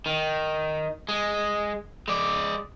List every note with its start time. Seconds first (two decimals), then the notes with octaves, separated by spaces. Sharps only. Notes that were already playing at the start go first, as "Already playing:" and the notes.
0.06 D#3
1.09 G#3
2.08 G#3 D5